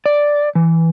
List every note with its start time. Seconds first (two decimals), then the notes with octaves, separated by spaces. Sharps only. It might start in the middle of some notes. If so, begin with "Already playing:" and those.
0.06 D5
0.55 E3